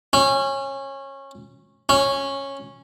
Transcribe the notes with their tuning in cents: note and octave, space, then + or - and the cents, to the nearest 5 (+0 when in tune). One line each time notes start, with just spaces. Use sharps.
C#4 -20
C#4 -10